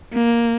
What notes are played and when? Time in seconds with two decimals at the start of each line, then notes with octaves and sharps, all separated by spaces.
0.13 A#3